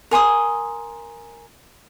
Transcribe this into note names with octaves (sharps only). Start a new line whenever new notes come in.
A#4 G#5 C6 D#6